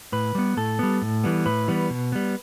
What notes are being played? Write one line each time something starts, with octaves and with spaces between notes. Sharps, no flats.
A2 B4
G3 B3
A2 A4
G3 B3
A2
E3 G3 B3
A2 B4
E3 G3 B3
B2
G3 B3